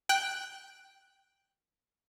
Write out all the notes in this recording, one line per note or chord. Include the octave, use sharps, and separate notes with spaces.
G5 F#6